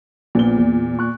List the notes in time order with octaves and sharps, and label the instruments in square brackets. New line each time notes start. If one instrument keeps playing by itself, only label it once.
[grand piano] A#1 B3 G7 [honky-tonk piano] A#2
[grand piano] E2
C#6 F#6